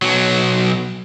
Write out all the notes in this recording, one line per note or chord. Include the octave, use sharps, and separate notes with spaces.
B1 F#3